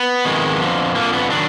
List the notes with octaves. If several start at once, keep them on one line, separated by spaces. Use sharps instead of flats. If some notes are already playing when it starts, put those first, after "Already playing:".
Already playing: B3
F2 D#3 G#3
F2 D3 F3
F2 D3 F3 A#3
B3
D#3 F#3 D4